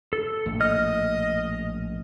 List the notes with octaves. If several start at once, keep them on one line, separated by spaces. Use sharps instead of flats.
A4
A#1 A2 A#3
D#5 F6